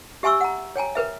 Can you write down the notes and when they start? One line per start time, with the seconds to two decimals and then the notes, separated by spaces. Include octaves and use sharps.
0.23 G4 E5 G#5 C6 C#6 E6
0.41 F#5 A#5
0.76 C#5 G5 G#5 A#5
0.95 A#4 B4 E5